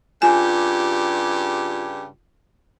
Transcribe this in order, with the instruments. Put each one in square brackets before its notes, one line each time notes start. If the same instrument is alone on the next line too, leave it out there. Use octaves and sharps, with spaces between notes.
[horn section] G2 C#3 G4 [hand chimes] F4 G6 [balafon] G#5